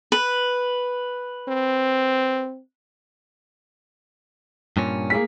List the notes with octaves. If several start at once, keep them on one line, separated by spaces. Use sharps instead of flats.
B4
C4
G2 A#2 C#4
A#3 G#4 B6